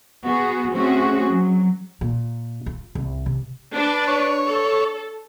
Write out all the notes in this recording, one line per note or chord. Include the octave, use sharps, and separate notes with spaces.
B3 F#4 G#4
A3 C4 C#4 F#4 G#4
F#3
A#2
F4
C2
C3
D4 B4
C#5
A4